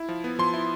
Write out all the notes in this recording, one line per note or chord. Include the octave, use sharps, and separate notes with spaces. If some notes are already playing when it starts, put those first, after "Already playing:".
Already playing: E4
F3
B3
F3 C6
E4